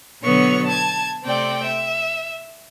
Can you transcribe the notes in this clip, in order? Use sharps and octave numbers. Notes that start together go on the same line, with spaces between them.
B2 D3 F#3 B3 C#5 C#6
A5 G#6
C3 A3 C4 D5 G5
E5